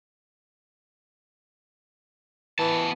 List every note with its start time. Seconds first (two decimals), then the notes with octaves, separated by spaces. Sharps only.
2.59 E3 B3 A5